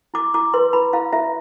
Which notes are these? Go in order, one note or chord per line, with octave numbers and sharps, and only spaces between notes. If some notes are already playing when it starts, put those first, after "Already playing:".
E4 D6
E4 D6
B4 C6
E4 B5
E4 F5
E4 E5